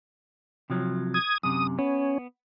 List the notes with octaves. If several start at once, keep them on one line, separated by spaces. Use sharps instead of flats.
C3 F3 F#3
D#6 G#6
F#2 C3 D#6
B3 C#4